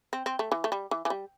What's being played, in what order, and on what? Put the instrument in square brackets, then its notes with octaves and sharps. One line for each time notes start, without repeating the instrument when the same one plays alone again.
[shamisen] C4
C4
A3
E3
A3
G3
E3
E3
G3